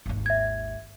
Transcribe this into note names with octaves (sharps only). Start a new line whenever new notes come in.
G#1 D#2
E5 G#6